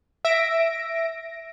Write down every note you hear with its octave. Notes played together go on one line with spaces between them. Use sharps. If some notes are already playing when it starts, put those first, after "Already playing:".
E5 A#6 D7